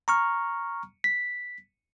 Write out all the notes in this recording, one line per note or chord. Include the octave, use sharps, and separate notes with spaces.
A#5 C#6 F6
B6